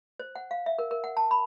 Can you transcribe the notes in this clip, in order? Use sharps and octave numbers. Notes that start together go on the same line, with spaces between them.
C5
F#5
F5
E5
A#4
A#4
F#5
A5
B5